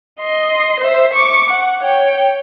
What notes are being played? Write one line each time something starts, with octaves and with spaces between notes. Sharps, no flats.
D#5 C6
C5 E5
C#6 D6
F#5
C#5 G5